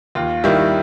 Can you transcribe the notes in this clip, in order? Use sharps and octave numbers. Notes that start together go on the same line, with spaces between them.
D#2 F4
D#3 G3 E4